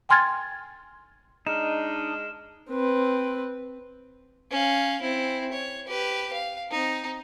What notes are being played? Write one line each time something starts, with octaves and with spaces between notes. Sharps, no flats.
G5 G#5 C6 F6 G#6 A6
G#3 D4 D#4 F6 E7
C4 B4
C#4 F5
C4 E4
C#5
G4 B4
F5
C4 D#4